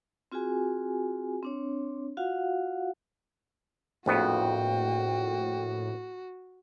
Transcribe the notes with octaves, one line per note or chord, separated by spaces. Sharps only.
C4 F4 F#4 G#4 G#5
C4 D4 C#5
F4 F#4 F5 F#5
A#1 F2 A2 B3 F#4 G5